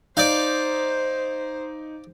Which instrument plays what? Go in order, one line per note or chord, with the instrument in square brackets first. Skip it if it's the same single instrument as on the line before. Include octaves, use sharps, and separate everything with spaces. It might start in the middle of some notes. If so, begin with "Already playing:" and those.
[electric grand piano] D#4 G6 [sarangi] C5 [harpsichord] D5 F5